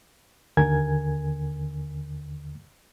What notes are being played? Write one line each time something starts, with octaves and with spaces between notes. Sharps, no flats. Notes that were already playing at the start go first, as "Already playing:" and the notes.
D#2 D3 A#4 G#5 G#6